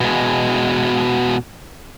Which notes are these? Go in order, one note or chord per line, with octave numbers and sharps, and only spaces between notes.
B2 G#3